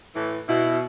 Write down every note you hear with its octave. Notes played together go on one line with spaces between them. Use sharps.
A2 E3
B2 E4